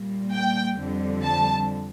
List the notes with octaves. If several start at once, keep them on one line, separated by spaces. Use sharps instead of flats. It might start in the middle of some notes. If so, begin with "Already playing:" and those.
Already playing: A#2 G3 A#3
G5
F2 D3 G3
A5